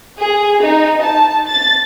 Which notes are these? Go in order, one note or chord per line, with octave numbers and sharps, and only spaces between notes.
G#4
D#4
A5
A6